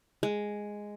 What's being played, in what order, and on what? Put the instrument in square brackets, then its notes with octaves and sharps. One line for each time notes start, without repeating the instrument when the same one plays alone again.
[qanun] G#3